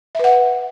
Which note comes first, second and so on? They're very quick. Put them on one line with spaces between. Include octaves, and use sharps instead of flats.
E5 B4 F#5